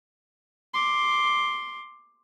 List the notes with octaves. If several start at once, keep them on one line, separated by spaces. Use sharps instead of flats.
C6 D6